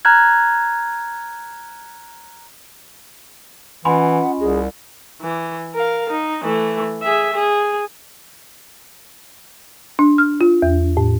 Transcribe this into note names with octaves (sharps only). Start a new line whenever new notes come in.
A#5 F6 F#6 G#6
E3 C#4 F4 D#5 F#5 G#5 B5 C6
C2 G#4
E3
A#4 F5
D#4
E3 A3
G#4 E5
G#4
D4
F6
F4
E2
A2